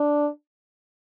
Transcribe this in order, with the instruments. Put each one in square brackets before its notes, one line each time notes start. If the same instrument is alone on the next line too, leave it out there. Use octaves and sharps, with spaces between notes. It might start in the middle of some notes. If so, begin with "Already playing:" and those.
Already playing: [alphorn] D4